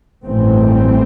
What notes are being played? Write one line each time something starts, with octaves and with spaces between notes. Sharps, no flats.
A1 G2 E3 A3 C4